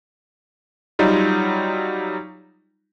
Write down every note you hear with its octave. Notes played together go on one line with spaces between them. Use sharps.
F#3 G3 D#4 F4